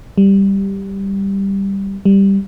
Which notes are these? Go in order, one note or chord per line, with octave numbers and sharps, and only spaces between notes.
G3
G3